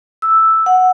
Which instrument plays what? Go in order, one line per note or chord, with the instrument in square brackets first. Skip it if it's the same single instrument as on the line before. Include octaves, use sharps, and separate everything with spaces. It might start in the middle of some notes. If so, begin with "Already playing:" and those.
[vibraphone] E6
F#5